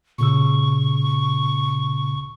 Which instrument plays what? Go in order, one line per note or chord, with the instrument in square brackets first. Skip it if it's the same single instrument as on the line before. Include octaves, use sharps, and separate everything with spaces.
[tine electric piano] A#2 C#3 E6 [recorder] C#6